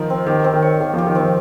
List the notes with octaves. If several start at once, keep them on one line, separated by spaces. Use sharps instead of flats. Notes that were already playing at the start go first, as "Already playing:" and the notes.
Already playing: D#3 F3 D#4 A#4
C4
D#3 G4
C4
D#3
C#5
D#3 F5
F3
G4
D#3
F3 C4